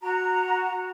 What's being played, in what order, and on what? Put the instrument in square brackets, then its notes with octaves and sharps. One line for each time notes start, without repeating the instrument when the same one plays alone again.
[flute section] F#4 A#5